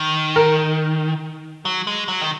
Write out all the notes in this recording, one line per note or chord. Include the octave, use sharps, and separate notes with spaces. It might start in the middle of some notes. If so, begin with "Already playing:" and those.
Already playing: D#3
A#4
F#3
G#3
F#3
D#3